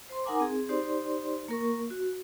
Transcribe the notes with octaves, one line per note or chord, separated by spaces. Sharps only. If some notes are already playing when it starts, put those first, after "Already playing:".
C5 C6
D#4 A#4 F#5 G#5 A#5 D6
C4 G#4
D#4 G4 C5 D5 C6
A#3 A#4 C#6
F#4